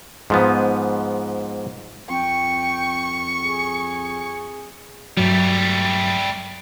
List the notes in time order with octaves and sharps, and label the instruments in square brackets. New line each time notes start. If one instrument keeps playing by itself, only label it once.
[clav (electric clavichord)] G#2 F3 B3
[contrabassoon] F2 [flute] G5 [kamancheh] C#6
[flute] G#4
[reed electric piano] G2 F#3 [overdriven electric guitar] G3 A3